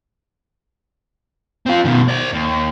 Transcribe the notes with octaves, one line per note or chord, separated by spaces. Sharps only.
C4 F4
B2 D#3
C5 D5
D#2